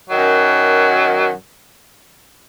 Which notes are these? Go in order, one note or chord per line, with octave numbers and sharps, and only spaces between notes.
F#2 D#3 F#3